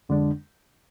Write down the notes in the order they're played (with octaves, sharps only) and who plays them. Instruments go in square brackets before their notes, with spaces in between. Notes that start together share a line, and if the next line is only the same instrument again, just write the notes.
[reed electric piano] F2 D3 G#3 D4